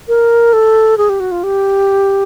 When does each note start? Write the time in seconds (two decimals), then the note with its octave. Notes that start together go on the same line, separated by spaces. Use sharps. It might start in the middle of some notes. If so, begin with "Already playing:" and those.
0.08 A#4
0.53 A4
0.98 G#4
1.09 G4
1.20 F#4
1.32 F4
1.44 G4